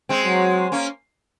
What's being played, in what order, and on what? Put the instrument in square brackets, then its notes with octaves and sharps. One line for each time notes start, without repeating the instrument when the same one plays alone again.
[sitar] G#3 C4
[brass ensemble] F#3
[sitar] A#3 C#4